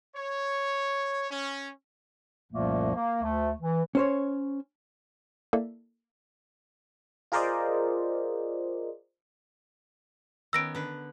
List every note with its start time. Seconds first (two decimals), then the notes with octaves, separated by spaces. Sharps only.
0.16 C#5
1.30 C#4
2.52 C2 F#2 A#2 F3 A3 A#3
2.95 A#3
3.22 D2 A3
3.61 E3
3.95 C#4 C5 C#5
5.53 A#3 E4 A4 D5 E5
7.32 F4 G#4 A#4 C5 D5 D#5
10.53 D#3 B3 C#4 E6 A#6 D7
10.75 D3 B4